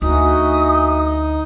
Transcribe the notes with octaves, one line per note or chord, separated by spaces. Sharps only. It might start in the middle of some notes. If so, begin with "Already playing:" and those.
D2 D#4 F#4 E5 G#5 D#6